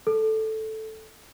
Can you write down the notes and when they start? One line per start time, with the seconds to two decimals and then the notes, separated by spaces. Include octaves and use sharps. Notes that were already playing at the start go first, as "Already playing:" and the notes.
0.07 A4